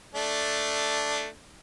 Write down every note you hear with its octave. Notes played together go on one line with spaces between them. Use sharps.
A3 D4